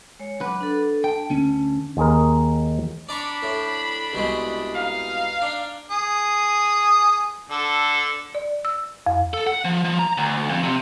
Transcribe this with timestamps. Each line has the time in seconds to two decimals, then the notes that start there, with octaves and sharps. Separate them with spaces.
0.20 G#3 C#5
0.41 F#3 B4 F#5 D6
0.61 D4 A4
1.04 G5 A5
1.30 D2 C#4
1.97 D#2 G#4 A#4
3.09 D4 D5 A#5 B5 C#6
3.43 A2
4.13 C2 B2 G#3
4.76 D#4 F5
5.42 D4
5.90 G#4 G#5 D#6
7.50 D3 A4
8.35 D5
8.65 E6
9.06 F2
9.34 A4
9.47 F#5
9.65 F3
9.85 F3
9.99 A#5
10.18 D2
10.50 F2
10.63 C3